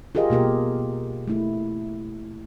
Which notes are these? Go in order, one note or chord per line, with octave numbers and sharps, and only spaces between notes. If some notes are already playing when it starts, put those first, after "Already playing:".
F4 G4 G#4 A#4 D#5
B2 A#3 G4 A#4
A3 E4